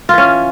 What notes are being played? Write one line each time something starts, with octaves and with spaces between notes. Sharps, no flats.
E3 C#4 F4